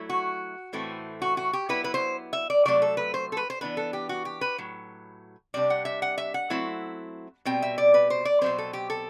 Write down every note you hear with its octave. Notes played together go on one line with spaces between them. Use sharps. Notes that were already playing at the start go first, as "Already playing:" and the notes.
Already playing: F#3 A3 E4
F#4
A2 E3 A3 C4
F#4
F#4
G4
F#3 B3 E4 B4
B4
C5
E5
D5
C3 F#3 A3 D5
A4
B4
C5
A4
B4
C5
E3 B3 D4 B4
A4
G4
F#4
G4
B4
A2 F#3
C3 G3 D4 D5
F#5
E5
F#5
E5
F#5
F#3 A3 C4 E4
B2 G3 C4 G5
E5
D5
B4
C5
D5
B2 F#3 A3 C4 C5
A4
G4
A4